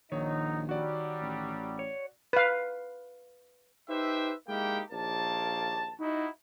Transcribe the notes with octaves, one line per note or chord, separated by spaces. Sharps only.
A#1 D#3 F#3 D#4 C#5
F#3 G3 F#4 D5
A1
C#5
B4 F5
D#4 G4 B4 C5 E5
G#3 A#3 D#4 E4 G4 G5
A#1 D#2 A#3 A5
D#4 E4 F#4